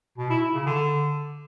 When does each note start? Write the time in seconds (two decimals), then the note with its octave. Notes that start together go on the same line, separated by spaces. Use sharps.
0.18 B2
0.30 E4
0.42 E4
0.54 C#3
0.66 D3